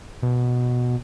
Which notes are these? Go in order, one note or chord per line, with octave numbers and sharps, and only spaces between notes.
B2